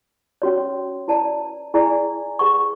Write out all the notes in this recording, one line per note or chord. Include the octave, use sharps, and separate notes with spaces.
C#4 F#4 C#5
E4 B4 D5 A5
E4 G#4 D5 G#5
G#4 B4 F#5 C#6